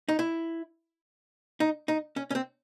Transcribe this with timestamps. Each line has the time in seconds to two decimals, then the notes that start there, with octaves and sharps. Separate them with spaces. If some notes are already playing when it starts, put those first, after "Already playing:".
0.09 D#4
0.19 E4
1.60 D#4
1.88 D#4
2.16 C#4
2.31 C#4
2.35 C4